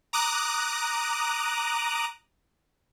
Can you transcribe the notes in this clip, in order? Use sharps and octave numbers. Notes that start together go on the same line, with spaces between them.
A#5 D6 D#6 F#6